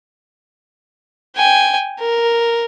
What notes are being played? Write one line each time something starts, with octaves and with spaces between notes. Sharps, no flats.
G5 G#5
A#4